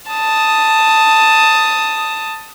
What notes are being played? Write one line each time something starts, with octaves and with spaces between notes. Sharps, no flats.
A5 D#6